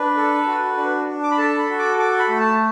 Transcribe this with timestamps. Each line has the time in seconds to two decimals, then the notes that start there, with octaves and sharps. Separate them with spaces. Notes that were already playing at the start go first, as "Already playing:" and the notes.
Already playing: D4 B4
0.17 A4
0.47 F#4
0.77 D4
1.07 D4
1.24 D6
1.31 B5
1.38 A4 A5
1.58 B5
1.69 F#4
1.79 D6
1.98 A4 D6
2.19 B5
2.29 A3
2.40 A5